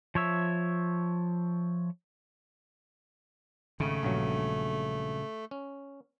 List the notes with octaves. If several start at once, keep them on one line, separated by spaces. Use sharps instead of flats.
F3 C#5 E5
G#1 C#3 A3
A#1 G2 F#3
C#4